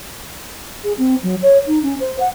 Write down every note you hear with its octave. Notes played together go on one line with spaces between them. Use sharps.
G#4
C4
F#3
C#5
D#4
C#4
C5
F#5